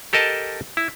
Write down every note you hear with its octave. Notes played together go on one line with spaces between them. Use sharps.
G4 A4 A#4 D#5 A5
E4